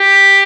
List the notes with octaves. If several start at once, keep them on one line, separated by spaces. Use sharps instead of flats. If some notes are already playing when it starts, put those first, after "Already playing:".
Already playing: G4